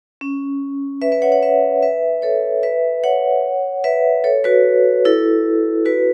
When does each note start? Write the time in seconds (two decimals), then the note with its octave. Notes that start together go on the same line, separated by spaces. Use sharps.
0.21 C#4
1.02 B4 E5
1.12 B4 E5
1.22 C#5 F#5
1.32 C#5 F#5
1.43 B4 E5
1.82 B4 E5
2.22 A4 C#5
2.63 B4 E5
3.04 C#5 F#5
3.84 B4 E5
4.24 A4 C#5
4.44 F#4 B4
5.05 E4 A4
5.85 F#4 B4